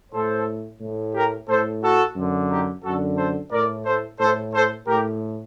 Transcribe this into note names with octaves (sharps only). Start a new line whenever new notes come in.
A2 A4 C5
A2
G4 A#4
A2 A4 C5
F#4 A4
F#2 D3
D#4 G4
F#2 D3 F#4 A4
A4 C5
A2 A#4 D5
A4 C5
A2 A4 C5
A4 C5
A2 G4 A#4